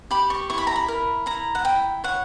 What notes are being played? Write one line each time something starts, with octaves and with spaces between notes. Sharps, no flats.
G4 B5
C#6
E4 C#6
B5
A#5
B5
A#4
E4 A#5
F#5
E4 G5
C#5 F#5